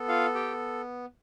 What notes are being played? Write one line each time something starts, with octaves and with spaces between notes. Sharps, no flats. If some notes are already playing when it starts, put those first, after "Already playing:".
Already playing: B3 A4
F4 F5
G4 G5